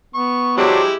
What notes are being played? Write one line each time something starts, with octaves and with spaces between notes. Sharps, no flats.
B3 C#6
F#3 G#3 D4 E4 G4 C5